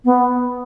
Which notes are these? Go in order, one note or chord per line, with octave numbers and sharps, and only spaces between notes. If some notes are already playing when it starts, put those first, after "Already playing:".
B3